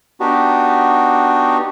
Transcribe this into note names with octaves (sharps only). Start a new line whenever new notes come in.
B3 D4 D#4 F#4 G4